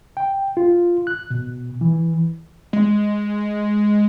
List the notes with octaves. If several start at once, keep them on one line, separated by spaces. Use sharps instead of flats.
G5
F4
F#6
B2
E3
G#3